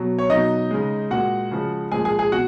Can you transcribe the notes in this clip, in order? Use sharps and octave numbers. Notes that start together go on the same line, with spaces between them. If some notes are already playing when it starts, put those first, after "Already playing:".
Already playing: B2 F#3
C#5
B2 F#3 D#4 D#5
C#3 G#3
A#2 G#3 F#4 F#5
C#3 F3 G#3
A#2 F3 G#3 G#4 G#5
G#4 G#5
G#4 G#5
B2 F#4 F#5